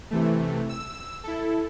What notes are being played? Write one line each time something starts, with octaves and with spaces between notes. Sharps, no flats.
C3 E3 A3
E6
E4 A4